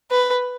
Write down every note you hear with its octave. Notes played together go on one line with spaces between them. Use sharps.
B4